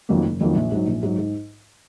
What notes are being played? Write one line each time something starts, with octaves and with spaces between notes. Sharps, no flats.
F2 D#3 F#3 A#3
F#1
F2 D#3 F#3 A#3
A#1
G#2 F#3
A#1
G#2 F#3
G#2